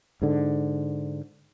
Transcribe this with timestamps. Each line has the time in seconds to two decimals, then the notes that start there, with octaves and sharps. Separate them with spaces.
0.22 G#2 D3